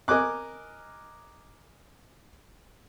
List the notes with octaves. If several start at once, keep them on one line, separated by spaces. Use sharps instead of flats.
A#4 D#5 G#5 D6 F#6